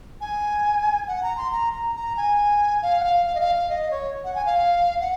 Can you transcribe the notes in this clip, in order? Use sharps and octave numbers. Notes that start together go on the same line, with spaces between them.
G#5
F#5
A#5
C6
A#5
A#5
A#5
G#5
F5
F#5
F5
F5
D#5
F5
F5
D#5
C#5
F#5
G#5
F5
F#5